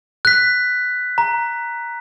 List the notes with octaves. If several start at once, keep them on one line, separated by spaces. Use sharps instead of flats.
F#6 B6
A#5